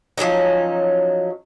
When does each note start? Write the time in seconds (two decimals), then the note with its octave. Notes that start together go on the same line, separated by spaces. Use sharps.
0.18 F3 F#3 C#4 D#4